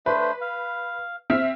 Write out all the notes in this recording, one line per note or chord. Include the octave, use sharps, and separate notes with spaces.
A3 D4 B4 C5
F5
C4 E5 F6